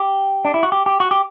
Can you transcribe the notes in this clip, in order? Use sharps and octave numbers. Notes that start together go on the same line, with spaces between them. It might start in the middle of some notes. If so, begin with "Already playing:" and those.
Already playing: G4
D4
E4
F#4
G4
G4
F#4
G4